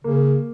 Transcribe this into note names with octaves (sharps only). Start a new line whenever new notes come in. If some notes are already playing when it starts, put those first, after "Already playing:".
C#3 A#3